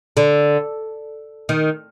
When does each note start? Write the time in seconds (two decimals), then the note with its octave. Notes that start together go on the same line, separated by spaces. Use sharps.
0.17 D3
1.49 D#3